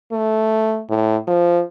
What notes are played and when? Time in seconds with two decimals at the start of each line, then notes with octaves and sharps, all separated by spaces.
0.12 A3
0.90 A2
1.28 F3